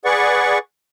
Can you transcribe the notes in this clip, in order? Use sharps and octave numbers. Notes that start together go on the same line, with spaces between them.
G#4 B4 D5 F#5 C#6